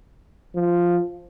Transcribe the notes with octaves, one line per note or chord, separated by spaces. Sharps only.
F3